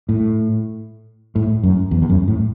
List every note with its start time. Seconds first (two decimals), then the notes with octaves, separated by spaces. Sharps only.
0.09 A2
1.36 A2
1.63 F#2
1.91 E2
2.02 E2
2.10 F#2
2.28 A2